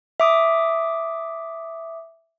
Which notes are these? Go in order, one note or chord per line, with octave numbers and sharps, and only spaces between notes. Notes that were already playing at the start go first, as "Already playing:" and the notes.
E5 D6 D#6